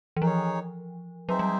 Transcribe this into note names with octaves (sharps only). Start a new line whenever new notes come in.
E3
F3 D#4 G#4 C#5
F#3 C4 D#4 G#4 C5 E5
G3